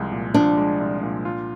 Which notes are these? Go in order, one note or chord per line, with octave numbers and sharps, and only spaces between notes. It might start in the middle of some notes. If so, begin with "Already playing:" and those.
Already playing: C2 F3 G#3
A#2
F3 D4
G#3
C2
A#2
F4